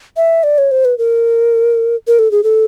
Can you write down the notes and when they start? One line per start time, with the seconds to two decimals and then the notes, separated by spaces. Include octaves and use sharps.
0.17 E5
0.43 D5
0.58 C#5
0.71 C5
0.85 B4
0.98 A#4
2.07 A#4
2.19 A4
2.31 G#4
2.43 A4